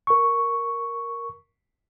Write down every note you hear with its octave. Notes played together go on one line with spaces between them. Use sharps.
A#4 C#6